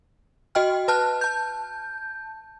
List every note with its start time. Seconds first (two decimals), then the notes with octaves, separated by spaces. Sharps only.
0.55 F#4 D#5 G5 F6
0.88 B4 A5 F6 F#6
1.21 A5 G6